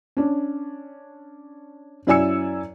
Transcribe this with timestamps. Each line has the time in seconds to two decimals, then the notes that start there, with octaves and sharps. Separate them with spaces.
0.17 C#4 D4
2.07 F#2 E4 D5 G#5 E6 C#7